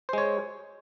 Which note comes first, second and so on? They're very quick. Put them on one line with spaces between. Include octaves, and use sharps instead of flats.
C5 G#3 C#5